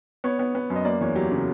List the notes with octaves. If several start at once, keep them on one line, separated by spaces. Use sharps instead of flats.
B3 C#5
B3
B3
F#2
D#5
A#3 D5
E2 C#5
F#3 G4
C#3